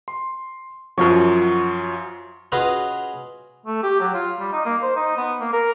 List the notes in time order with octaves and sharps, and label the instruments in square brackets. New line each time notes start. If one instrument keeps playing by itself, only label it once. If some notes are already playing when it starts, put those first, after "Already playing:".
[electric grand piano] C6
[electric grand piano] F#2 F3 F#3 [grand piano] F4 C#6
[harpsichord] C#4 F4 F#4 G#4 B4 D#5
[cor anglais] A3
G4
F#3
F4
G3
D#4
A#3
C5
D#4
B3
A#3
A#4